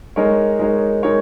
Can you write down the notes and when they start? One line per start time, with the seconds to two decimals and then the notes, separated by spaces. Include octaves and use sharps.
0.16 G#3 D#4 A#4 C#5
0.59 G#3 D#4 A#4 C#5
1.03 G#3 D#4 A#4 C#5